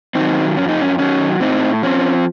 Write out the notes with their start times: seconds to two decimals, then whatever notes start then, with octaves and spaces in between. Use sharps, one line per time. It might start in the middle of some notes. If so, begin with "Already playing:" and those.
0.15 D#3 F#3 C4 D#4
0.57 F2 C#4
0.69 D#4
0.82 C#4
0.98 D#3 F#3 C#4
1.40 A2 C4 D#4
1.83 F3 C4 C#4